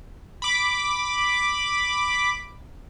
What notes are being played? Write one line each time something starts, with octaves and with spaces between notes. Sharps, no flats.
B5 D6